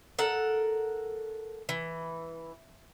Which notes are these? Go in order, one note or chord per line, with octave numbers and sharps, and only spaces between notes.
A4 A#4 F#5
E3